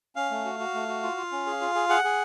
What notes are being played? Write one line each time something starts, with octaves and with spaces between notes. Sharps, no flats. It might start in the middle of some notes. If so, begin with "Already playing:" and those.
C#4 F5
A3
F#4
F#4
A3
F#4
F4
F4
C#4
G#4
F4
G#4
G#4 F#5
G#4